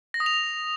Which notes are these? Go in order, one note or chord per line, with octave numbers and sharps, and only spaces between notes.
A#6
D#6
F7